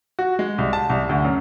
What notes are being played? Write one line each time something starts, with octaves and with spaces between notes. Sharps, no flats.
F#4
G#3
C2
A5
C2
D2
F#2